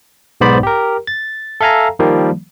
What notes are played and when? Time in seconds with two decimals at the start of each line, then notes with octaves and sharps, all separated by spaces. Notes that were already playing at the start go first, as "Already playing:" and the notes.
0.41 B1 G#2 B3 C5 D5 B5
0.63 G4 A#4
1.07 A6
1.61 A4 E5 F5 G#5 A#5
1.99 D#3 F3 G3 A#3